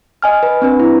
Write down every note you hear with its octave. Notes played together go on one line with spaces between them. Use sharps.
D#5 G#5 F6
B4
C4 D4 B4
E4